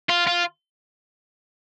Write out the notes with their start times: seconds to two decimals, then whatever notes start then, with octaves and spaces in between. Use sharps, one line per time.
0.10 F4
0.27 F4